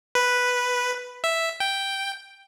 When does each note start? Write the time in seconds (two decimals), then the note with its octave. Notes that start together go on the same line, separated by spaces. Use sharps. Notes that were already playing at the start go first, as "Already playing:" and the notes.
0.15 B4
1.24 E5
1.60 G5